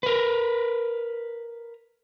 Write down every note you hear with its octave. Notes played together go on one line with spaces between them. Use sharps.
A#4 B4